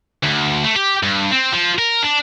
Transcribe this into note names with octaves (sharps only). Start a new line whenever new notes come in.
D2
A3
G4
G2
C4
F3
A#4
D4